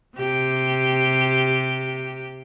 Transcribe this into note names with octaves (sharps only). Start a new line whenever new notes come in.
C3 G4